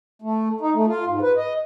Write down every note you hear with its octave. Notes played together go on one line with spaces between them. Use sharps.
A3
D#4
A3
F4
G#2
B4
D#5